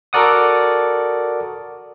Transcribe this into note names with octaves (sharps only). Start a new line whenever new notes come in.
F#4 A4 A#4 D5 F#5 D#6